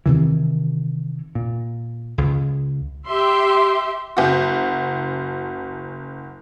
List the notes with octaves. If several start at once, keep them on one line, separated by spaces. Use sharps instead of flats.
C3 D#3 E3
A#2
C#2
G4 E5 C6
F#1 F#4